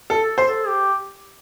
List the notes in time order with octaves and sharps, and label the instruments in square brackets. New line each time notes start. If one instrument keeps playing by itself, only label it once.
[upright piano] A4
[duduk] A4
[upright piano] C5
[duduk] A4
G4